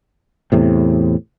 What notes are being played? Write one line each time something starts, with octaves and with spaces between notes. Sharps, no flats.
E2 A2 C3